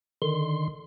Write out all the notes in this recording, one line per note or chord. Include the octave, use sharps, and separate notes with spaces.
D3 D#3 C6